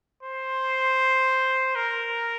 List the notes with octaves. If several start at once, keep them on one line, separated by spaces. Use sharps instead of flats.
C5
A#4